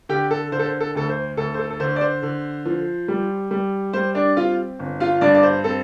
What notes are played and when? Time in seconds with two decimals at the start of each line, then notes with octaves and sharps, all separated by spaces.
0.09 D3 G4 G5
0.31 A4
0.52 D3 C5
0.59 A4
0.66 C5
0.80 A4
0.95 D2 A4
1.09 C5
1.37 D2 A4
1.54 C5
1.59 A4
1.70 A4
1.80 D3 C5
1.96 D5
2.01 C5
2.23 D3
2.65 F3
3.08 G3
3.51 G3
3.93 G3 C5
4.15 D4 D5
4.37 C4 F4 F5
4.79 G1
5.00 F4 F5
5.21 G2 D4 D5
5.35 D5
5.43 C5
5.64 C4 A4